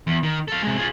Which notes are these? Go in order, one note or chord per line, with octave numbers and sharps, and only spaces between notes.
E2
D#3
A4 F5
C3 G#3
F4 G#4